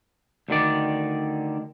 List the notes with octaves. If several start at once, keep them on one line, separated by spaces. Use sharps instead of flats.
D2 D3 D#3 D5